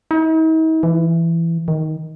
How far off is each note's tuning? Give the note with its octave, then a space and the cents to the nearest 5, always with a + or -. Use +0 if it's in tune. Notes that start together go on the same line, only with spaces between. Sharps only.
D#4 +45
E3 +15
D#3 +10